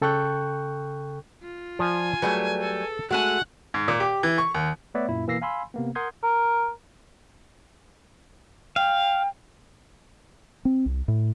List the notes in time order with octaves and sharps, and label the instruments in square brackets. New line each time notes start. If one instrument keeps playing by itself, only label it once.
[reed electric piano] C#3 A4 G5 C#6 F#6 G6
[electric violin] F4
[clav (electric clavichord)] F3 D5 [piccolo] G#5
[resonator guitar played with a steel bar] F#3 G3 A3 [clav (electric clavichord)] G#4 B4
[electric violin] A4
[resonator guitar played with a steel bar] G#3 A3 G#5 [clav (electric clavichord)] F#4 [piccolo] F#5 [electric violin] F#6
[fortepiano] G#2
A#2
G4
E3
C#6
D#2
[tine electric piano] A3 B3 B4 C#5 D5 E5
F#2 A#2 A#3 E4
B2 E3 A#3 E6 A#6 C7
F5 G#5 B5 C6 E6
C3 A#3 B3
A#4 F#5 C6 D#6 G6 G#6
[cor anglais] A#4
[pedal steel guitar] F5 [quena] G5
[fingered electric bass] C4
C2
A2